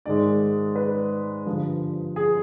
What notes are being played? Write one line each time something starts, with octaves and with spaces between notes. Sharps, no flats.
G#2 D#3 G#3 D5
B4
G2 D3 F3
G#4